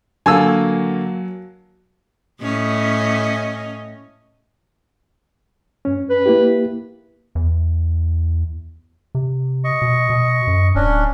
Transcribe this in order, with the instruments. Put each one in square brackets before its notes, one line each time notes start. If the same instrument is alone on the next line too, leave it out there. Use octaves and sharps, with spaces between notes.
[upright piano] D3 A#3 [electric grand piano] F#3 F#4 [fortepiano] G#5 A5 E6
[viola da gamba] A2 C#4 D#5
[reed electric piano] G2 C#4
[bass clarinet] B4
[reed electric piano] A#3 E4 G4
[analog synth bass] E2
C3
[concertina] D#5 C#6
[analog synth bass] B2
B2
F#2
[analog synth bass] D1 [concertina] C#4 D4